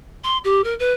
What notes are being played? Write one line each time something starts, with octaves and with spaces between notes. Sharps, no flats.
C6
G4
A#4
B4